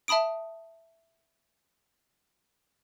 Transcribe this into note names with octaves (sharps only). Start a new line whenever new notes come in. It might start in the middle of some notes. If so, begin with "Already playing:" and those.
E5 A5 B5 D#6 D7